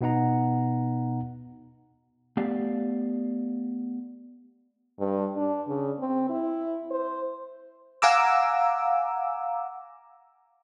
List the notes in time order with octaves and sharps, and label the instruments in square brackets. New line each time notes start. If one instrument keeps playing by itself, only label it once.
[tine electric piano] B2 B3 D#4 F#5 A#5
[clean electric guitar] A3 B3 G4 D5 F5
[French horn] G2
D4
C#3
C4
E4
C5
[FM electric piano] F5 F#5 G#5 A#5 D6 E6